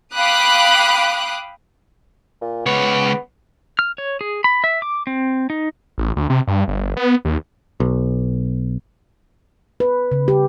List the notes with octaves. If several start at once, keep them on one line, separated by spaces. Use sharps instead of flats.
F5 G5 B5 D6 D#6 F#6
A#2
C#2 B3 C#5
F6
C#5
G#4
B5
E5
D6
C4
D#4
A1
D2
C3
G2
G1
B3
D#2
B1
B4
C#3
G4